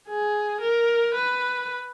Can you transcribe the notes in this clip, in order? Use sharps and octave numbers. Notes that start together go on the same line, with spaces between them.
G#4
A#4
B4